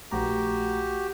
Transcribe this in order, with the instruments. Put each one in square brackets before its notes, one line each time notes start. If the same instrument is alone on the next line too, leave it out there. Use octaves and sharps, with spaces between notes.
[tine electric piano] A#1 A3 A#5 [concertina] F#4 G4